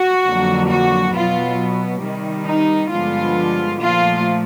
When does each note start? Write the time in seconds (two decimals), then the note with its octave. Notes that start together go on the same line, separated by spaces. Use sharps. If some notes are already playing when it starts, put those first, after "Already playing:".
Already playing: F#4
0.24 F2 D3 F#3 A#3
0.68 F#4
1.14 B2 F#3 B3 F4
2.03 C3 D#3 G3
2.48 D#4
2.93 G2 D3 F3 G#3 B3 F4
3.82 A#2 F3 A3 F4